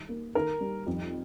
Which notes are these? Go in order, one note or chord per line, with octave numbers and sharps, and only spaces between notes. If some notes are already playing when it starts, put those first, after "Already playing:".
Already playing: D#3 G3
A#3
D#3 A#4
G3
F2